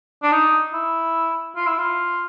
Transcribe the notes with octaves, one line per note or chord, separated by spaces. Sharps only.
D4
D#4
E4
F4
E4
F4